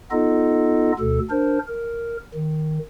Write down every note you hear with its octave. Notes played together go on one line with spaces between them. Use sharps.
B3 D#4 F4 A4 D#5
D2 B2 A4
D4 A#4 C5
A#4
D#3